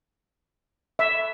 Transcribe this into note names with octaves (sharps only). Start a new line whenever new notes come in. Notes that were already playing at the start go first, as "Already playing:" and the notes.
E5